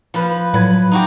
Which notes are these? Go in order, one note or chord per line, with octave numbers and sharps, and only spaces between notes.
F3 B4
A2 F#3 B4 G#6
D#4 F#4 G4